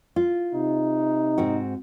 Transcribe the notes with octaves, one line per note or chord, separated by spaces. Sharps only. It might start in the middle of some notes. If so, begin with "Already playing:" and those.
F4
C3 D#4
G#2 C4 F#4